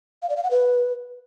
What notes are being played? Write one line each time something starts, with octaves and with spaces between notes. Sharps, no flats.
F5
D5
F5
F#5
B4